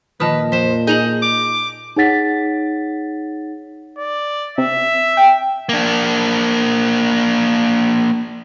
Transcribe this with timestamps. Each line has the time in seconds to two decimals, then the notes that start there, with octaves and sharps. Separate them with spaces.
0.20 A#2 D#3 F3 B4 D#5 A5 D#6
0.52 F2 C5 B6 E7
0.87 D#4 G#4 D#5 G6 F7 F#7
1.22 D6
1.96 D#4 G#4 C#5 F#5 A6 B6
3.98 D5
4.58 C3 E5
5.17 G5
5.69 A#3 D4